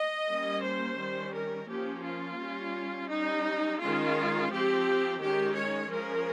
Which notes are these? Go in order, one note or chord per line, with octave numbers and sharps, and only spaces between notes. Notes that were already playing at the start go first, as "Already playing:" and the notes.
Already playing: D#5
G3 A#3 C#4
C5
D#3 G3 C#4
A#4
F3 A#3 C#4 G4
F4
G3 C#4
G3 C#4 D#4
D#3 G#3 C#4 F4
F3 C4 G4
D#3 G#3 C#4 G4
C#5
F3 G#3 C#4 A#4